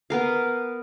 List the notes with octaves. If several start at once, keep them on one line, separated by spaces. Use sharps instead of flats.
B3 A#4 F5